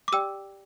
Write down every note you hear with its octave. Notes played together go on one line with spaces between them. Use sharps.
D6
G4 D5 G5 E6